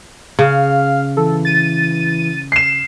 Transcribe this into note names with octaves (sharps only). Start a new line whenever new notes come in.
C#3 F5
E3 A4
A6 D#7
C7 E7